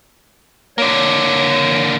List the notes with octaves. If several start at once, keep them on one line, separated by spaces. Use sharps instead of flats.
D3 A#3 C#5